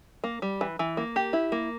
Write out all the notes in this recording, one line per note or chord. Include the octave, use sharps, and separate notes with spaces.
A#3
G3
E3
E3
A#3
G4
E4
A#3